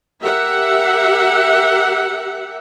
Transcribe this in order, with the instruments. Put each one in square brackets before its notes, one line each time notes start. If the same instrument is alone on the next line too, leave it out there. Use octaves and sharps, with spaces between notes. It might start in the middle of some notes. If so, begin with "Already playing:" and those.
[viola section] G4 A#4 E5 F#5